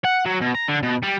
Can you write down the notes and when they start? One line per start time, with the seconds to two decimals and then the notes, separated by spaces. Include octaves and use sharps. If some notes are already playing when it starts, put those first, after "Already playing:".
0.05 F#5
0.26 F#3
0.41 B2
0.55 A#5
0.69 D3
0.83 B2
1.03 G3